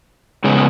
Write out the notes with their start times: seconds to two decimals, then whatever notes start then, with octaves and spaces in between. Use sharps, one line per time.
0.44 C#3 G#3 B3